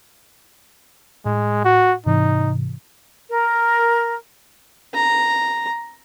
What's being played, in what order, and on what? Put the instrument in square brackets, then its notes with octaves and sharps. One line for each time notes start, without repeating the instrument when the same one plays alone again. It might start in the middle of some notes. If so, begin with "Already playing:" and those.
[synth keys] A2 [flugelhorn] G#3
[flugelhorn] F#4
[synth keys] G#2 C3 E3 [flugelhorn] D#4
[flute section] A#4
[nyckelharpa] A#5